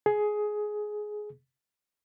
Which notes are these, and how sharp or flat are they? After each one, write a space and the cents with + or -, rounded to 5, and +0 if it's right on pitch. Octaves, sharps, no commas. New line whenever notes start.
G#4 +15